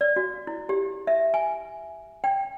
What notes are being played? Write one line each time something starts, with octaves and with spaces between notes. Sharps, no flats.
D5
F#4
E4
G4
E5
G#5
G5